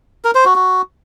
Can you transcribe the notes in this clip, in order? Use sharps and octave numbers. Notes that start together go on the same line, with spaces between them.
A#4
C5
F#4
F#4